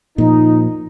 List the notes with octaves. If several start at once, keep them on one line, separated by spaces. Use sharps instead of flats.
A#2 F3 D#4